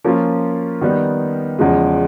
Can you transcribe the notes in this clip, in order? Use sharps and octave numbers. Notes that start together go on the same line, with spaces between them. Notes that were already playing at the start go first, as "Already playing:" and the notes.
F3 A#3 C#4 F4
D#3 G3 B3 D#4
E2 C#3 F3 G#3